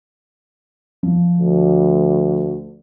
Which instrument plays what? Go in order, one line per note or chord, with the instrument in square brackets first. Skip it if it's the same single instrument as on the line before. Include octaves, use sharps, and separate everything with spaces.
[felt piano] F3
[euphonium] D2